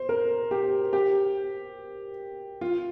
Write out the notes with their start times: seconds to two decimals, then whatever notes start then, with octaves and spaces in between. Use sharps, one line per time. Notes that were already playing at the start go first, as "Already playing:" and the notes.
Already playing: C5
0.09 A#4
0.51 G4
0.93 G4
2.61 F4